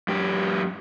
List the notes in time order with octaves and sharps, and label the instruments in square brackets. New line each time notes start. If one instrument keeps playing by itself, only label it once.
[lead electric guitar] F#2 G4